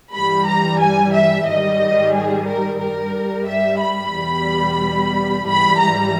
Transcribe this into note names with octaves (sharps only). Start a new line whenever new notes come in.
G2 E3 G3 B5
A#5
G#5
E5
G#2 D#3 G3 D#5
G#4
A#4
G2 G3 A#4
E5
B5
E2 B2 G3
G#2 E3 G3 B5
A#5